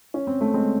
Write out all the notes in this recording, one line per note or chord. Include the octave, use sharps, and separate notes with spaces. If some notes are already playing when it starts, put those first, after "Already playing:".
C#4
C4
A3
G#3 C4